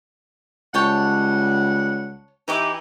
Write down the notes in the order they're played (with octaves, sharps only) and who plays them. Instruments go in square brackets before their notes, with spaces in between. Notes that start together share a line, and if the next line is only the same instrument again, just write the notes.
[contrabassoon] C#2 [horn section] G3 F#5 [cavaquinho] C#5 G5 A5
[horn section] E3 [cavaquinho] D#4 G4 D6